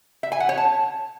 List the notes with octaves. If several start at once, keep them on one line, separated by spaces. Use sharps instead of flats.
E5
G#5
F#5
C#5
A5